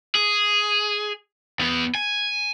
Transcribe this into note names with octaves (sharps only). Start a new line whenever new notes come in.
G#4
E2 B3
G#5